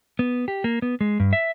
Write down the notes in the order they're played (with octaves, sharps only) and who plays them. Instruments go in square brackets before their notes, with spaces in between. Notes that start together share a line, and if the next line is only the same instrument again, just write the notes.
[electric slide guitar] B3
G4
A#3
B3
G#3
G2
E5